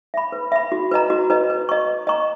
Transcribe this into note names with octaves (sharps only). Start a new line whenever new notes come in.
E5 B5
B4
E5 B5
F#4
B4 D#5 A#5
F#4
B4 D#5 A#5
B4
D#5 A#5 C#6
B4
D#5 A#5 C#6